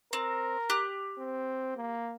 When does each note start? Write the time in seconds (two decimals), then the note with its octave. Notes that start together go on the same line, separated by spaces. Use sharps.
0.13 C4 A#4
0.70 G4 F#6
1.18 C4
1.77 A#3